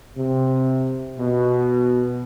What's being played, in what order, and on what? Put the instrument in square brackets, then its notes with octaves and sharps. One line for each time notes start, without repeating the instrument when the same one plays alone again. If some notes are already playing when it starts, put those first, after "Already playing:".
[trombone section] C3
B2